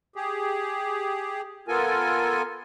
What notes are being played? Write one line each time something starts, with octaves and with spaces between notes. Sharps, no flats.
G4 G#4
B3 F4 A4 A#4 G#5